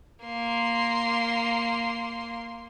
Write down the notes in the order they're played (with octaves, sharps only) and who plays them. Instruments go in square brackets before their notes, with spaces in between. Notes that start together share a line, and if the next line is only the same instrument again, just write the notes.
[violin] A#3 C6